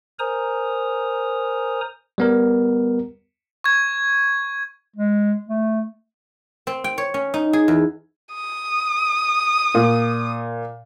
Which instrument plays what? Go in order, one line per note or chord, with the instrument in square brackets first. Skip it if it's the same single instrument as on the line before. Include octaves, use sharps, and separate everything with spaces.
[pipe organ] A#4 C5 G#5 A#5 D#6
[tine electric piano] G3 B3 A#4
[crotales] C#6 G#6
[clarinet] G#3
A3
[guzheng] C4
G5
C#5
C#4
D#4
G#4
E2
[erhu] D#6
[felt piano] A#2